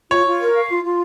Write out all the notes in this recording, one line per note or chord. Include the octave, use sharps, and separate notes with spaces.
F4 C#5
F4
A#4
F5
F4
F4